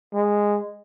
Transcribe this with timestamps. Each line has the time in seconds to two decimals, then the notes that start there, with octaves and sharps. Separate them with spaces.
0.14 G#3